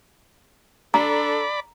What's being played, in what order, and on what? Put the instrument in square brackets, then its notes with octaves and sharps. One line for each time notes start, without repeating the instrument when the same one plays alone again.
[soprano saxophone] D4 [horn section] A4 [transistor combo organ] D5 B5 [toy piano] A#5